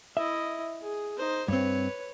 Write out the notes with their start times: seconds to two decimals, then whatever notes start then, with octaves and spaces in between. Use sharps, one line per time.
0.17 E4 D#5 E5
0.81 G#4
1.17 D#4 C5
1.48 G2 C4 B4 C#5